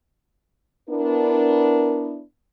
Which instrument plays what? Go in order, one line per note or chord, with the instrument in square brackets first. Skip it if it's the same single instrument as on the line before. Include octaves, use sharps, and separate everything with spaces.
[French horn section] B3 D4 E4 [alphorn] A#4